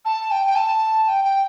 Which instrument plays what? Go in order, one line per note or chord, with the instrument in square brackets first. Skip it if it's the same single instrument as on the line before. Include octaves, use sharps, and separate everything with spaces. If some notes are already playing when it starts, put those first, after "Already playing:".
[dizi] A5
G5
G5
A5
G5
G5